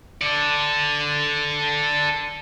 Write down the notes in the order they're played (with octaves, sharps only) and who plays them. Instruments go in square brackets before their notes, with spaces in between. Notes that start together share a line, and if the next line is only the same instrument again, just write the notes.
[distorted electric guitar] A4 D5